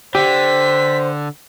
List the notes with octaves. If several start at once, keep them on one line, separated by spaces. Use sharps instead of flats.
D3 G4 C5 B6